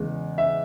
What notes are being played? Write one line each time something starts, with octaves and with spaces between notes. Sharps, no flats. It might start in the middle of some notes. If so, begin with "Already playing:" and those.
Already playing: E2 C#3 G#3
E5